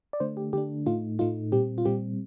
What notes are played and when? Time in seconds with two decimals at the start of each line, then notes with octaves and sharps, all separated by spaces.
0.13 D5
0.20 D3 A3 D4 C5
0.37 G4
0.53 D3 A3 D4 G4
0.86 A2 A3 D#4 F4
1.19 A2 A3 D#4 F4
1.52 A#2 G3 C4 G4
1.78 F4
1.85 A#2 G3 C4 G4